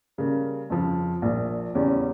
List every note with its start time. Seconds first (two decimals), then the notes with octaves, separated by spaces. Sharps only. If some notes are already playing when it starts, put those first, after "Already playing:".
0.18 C#3 G3 A#3
0.70 F2 C#3 F3
1.22 A#1 A#2 F3
1.75 E2 C#3 G3 C#4